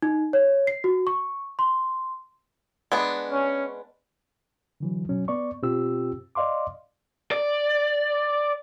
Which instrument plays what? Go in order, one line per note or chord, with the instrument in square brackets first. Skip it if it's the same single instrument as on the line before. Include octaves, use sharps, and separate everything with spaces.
[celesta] D#4
C#5
C7
F#4
C#6
C6
[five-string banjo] G#3 B3 D4
[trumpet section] C#4
[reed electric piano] D3 E3 F#3
B2 F#3 C#4
B3 D5 C#6
B2 C4 F4 G4 E6
D5 D#5 F5 C6 D6
[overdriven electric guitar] D5